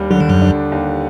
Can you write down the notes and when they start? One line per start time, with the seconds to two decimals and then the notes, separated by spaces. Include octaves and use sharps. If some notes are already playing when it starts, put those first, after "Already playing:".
Already playing: D#2 G3 D4
0.10 D3 F#3
0.20 D#3
0.29 F#2 F#3
0.42 D4
0.72 D#2